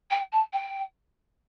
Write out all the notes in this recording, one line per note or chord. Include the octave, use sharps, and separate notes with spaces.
G5
A5
G5